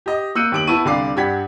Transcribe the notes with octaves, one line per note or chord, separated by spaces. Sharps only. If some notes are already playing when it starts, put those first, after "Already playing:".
G4 D#5
A#3 E6 F#6 G6 C#7 D#7
D#2 G4 D7 F#7
B3 E4 E5 A5 C#6 D#7
C2 D3 D5 F5 D6 C7
G2 D4 G4 F#5 G#6 B6